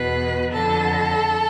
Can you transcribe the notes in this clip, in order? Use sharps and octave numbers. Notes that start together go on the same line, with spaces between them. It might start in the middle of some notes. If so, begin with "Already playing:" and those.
Already playing: E2 B2 B4
F2 D3 A4